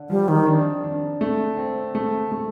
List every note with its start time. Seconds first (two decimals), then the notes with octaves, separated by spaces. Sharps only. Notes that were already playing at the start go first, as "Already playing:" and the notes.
Already playing: D3
0.10 F3 G3
0.28 D#3
0.47 D4
0.84 D4
1.21 A3
1.57 C4
1.95 A3
2.32 A3